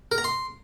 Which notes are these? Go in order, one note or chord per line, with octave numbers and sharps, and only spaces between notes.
A#4
A#5
C6